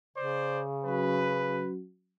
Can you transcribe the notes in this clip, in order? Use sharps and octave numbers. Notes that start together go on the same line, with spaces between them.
C#3 C5 D5
F#3 C#4 F#4 B4